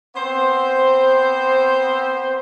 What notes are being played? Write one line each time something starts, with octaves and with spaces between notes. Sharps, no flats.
B3 C4 C5